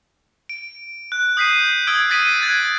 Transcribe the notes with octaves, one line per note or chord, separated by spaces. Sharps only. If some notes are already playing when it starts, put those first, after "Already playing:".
D7
F#6
D#6 G6 B6 C7 D#7
D#6 E6 G#6 D7
D#6 A6 B6 D7 D#7
F#6 G#6 A6